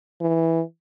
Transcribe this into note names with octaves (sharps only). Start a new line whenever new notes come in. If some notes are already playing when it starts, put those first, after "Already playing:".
E3